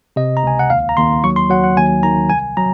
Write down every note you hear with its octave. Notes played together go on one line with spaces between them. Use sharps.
C3 D#5
A#5
C#2 G#5
F#5
D#2 F5
A#5
D#2 C6
F#3 C#6
C6
F#3 F#5
F#5
D#2 G#5
D#3 A#5
C2 G#5
F#3 A#5